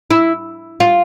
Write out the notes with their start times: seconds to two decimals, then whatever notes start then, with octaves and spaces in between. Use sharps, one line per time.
0.11 E4
0.80 F4